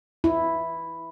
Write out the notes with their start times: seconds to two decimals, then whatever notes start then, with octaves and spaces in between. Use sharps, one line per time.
0.24 E4